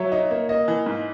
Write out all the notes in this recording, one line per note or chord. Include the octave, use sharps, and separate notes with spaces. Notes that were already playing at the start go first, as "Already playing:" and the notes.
Already playing: F#3 C#5 E5
D#4
A#3
A#3 D#5
E3
G#2